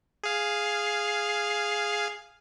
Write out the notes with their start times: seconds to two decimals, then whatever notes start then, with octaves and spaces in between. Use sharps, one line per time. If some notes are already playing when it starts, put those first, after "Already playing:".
0.23 G#4 F5